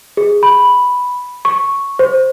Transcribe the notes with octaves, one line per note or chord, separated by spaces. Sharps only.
G#4
B5
C#6
C5